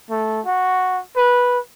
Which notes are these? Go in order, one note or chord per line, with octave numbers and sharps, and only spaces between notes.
A3
F#4
B4